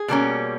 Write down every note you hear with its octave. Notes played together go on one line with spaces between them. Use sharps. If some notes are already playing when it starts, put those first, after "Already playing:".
Already playing: G#4
B2 G3 A#3 C#4